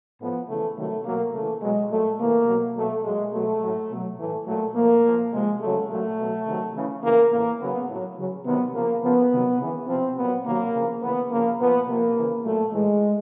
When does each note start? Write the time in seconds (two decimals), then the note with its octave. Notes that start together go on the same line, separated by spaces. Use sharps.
0.20 A2 F3 B3
0.49 C#3 E3 A3
0.77 C3 D#3 F#3 A3
1.05 B2 F#3 A#3
1.34 C#3 E3 A3
1.62 B2 F#3 G#3
1.91 A#2 F#3 A3
2.19 C3 E3 A#3
2.48 B2 F#3
2.77 B2 F#3 A3
3.04 A#2 F#3 G#3
3.33 B2 F#3 A3
3.62 A2 F#3
3.90 B2 F#3
4.19 A2 E3 A3
4.47 A#2 F#3 A3
4.76 A#2 F3 A#3
5.04 A#2 F3
5.33 C3 F3 G#3
5.61 C#3 F#3 A3
5.90 A#2 F#3 A3
6.18 B2 F#3
6.47 C3 D#3 F#3
6.76 C#3 E3
7.04 C#3 E3 A#3
7.32 A2 E3 A#3
7.61 C#3 F#3 B3
7.89 A2 F#3
8.18 C#3 F#3
8.46 C3 D#3 F#3 B3
8.74 C#3 F3 A#3
9.02 C#3 F3 B3
9.32 C3 D#3 F#3
9.60 C#3 E3
9.88 C3 F3 C4
10.17 A#2 F#3 B3
10.45 C3 D#3 F#3 A#3
10.74 C#3 F3
11.03 C#3 E3 B3
11.31 C#3 F3 A#3
11.59 A#2 F3 B3
11.88 C3 F3 A#3
12.16 C#3 E3
12.45 A#2 F#3 A3
12.73 A2 E3 G#3